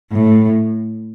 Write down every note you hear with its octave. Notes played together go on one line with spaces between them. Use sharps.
A2